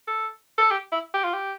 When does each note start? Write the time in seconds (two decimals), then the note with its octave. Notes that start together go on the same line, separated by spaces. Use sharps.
0.07 A4
0.58 A4
0.71 G4
0.92 E4
1.14 G4
1.24 F4
1.34 G4